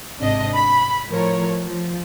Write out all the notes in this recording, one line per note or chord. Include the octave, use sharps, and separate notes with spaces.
G#1 C3 D4 D#5
B5
A2 F3 A#4 C#5
F3